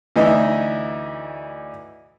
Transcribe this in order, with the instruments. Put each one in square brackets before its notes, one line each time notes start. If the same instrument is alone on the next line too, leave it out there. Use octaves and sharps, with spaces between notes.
[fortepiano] D2 E3 D#4 D#5 E5